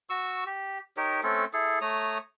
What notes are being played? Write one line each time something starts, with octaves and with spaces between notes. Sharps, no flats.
F#4 C#6 E6
G4
D#4 G4 A#4 C#5
A3 C4 C#4 A4
E4 G#4 A4
A3 C#5 A#5 D#6